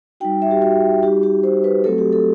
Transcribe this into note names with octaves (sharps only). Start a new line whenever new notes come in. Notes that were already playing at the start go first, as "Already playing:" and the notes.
G3 D#4 F#4 G5
E5
G4
F#4
G3 D#4 F#4 G4
G4
C5
B4
F#3 A3 C4 F#4 A4
G4
A4